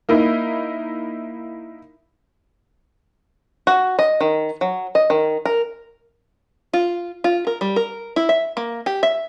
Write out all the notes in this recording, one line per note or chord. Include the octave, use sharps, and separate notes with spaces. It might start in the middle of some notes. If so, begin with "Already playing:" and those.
A#3 D#4 E4
F#4
D#5
D#3
F#3
D#5
D#3
A#4
F4
F4
A#4
G3
A#4
E4
E5
A#3
G4
E5